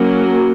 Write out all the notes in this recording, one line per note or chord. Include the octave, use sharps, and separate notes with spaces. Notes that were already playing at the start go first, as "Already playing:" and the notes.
Already playing: F#3 A#3 C#4